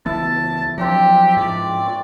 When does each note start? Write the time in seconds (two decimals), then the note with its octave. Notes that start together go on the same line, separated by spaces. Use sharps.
0.06 C#2 E3 B3 E4 A5
0.78 F3 F#3 C4 D4 G4 A#5
1.37 G#2 F3 D5
1.86 G5 C#6